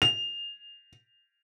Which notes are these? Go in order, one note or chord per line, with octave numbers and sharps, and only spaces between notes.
F7